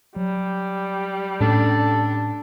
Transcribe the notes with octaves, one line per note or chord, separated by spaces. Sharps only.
F#3 G3
A2 C#4 D4 A4